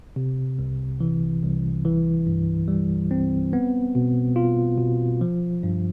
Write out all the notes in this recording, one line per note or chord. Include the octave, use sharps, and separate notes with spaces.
C3
C2
E3
C2
E3
G2
G3
C4
B3
B2
F4
B2
F3
G2